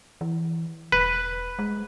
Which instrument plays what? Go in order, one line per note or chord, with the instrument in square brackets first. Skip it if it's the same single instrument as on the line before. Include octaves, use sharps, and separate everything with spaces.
[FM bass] E3
[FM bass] E1 [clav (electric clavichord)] B4
[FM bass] G#3